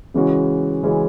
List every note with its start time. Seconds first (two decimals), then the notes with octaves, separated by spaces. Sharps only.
0.14 C#3 E3 G#3 C#4 F#4
0.83 C#3 E3 G#3 C#4 F#4